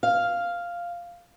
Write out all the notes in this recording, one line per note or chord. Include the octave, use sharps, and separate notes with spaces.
F5